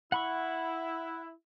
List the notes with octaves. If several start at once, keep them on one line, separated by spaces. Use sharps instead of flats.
E4 F#5 B5 C#6